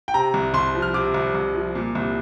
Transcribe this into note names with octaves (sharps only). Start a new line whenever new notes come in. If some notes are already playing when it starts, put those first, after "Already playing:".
G5
C3 A#5
C2
C2 C6
F3
F6
C3 D6
C2
C2
F3
A#2
C2